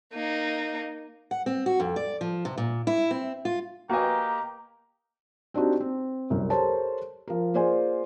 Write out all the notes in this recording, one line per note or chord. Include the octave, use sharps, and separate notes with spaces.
A#3 D#4
F#5
C4
F#4
F2
D5
F3
C3
A#2
E4
C4
F4
A#3 F#4 G4 B4 D#5 G#5 A#5
C4 D4 D#4 F#4 G4
C4
C2 F#2
G4 A4 A#4 C5 C#5 A5
F3 A#4
A#3 F4 G#4 C5 D5 G#5